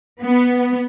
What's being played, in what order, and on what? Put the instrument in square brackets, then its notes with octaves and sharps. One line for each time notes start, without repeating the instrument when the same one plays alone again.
[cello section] B3